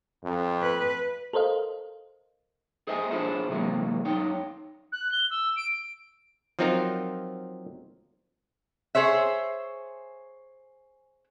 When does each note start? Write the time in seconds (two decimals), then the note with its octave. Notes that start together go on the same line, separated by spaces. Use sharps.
0.24 F2
0.63 B4
1.33 A4 A#4 C5 D#5 F5
2.87 G#4 C5 D#5 E5 F#5 G#5
3.11 D4 E4 F4 G#4 C5 C#5
3.49 C3 E3 F#3 G#3 A#3
4.05 F#2 D#4 C#5 G5
4.92 F#6
5.12 G7
5.31 E6
5.56 D7
6.59 F3 F#3 C4 D#4 F4 A#4
8.95 G#4 C5 C#5 E5